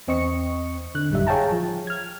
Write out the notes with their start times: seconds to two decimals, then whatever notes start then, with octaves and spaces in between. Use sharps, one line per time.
0.08 E2 C4 D#5 C#6 C#7
0.95 D3 F#6
1.10 A1 F#2 G3 D#4 E5
1.27 G#4 C#5 F5 G5 A5 A#5
1.52 F3
1.87 F6 G#6